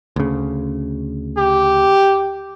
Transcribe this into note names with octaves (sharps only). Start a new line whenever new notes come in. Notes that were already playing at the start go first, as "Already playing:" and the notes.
D2 C#3
G4